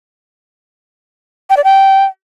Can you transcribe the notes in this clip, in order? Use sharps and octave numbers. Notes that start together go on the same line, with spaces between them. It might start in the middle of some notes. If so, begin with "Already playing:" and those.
G5
D5
G5